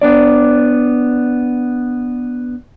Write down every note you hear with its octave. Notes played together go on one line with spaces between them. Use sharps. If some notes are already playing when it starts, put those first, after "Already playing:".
B3 D4 D5